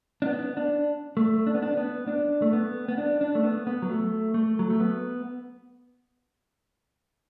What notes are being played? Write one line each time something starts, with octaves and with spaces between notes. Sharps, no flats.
D4
B3
D4
A3
D4
B3
D4
B3
D4
A3
B3
B3
D4
D4
A3
B3
B3
F#3
A3
A3
F#3
A3
B3